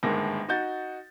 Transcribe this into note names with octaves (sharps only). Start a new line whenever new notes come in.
G1 D#2 G#2 D#3 G#3 A#6
D#4 F#4 G6 A6